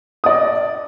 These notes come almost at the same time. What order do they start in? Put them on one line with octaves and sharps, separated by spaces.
D#6 D5 D#5